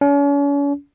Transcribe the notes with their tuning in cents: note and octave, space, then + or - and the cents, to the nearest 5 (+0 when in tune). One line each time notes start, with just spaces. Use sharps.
C#4 +40